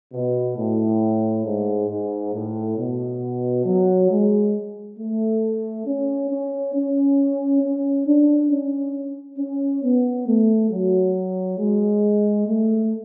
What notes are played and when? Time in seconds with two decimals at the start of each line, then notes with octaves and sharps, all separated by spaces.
0.14 B2
0.58 A2
1.46 G#2
1.90 G#2
2.34 A2
2.78 B2
3.66 F#3
4.10 G#3
4.98 A3
5.87 C#4
6.30 C#4
6.74 C#4
7.63 C#4
8.06 D4
8.51 C#4
9.39 C#4
9.83 B3
10.27 A3
10.71 F#3
11.59 G#3
12.47 A3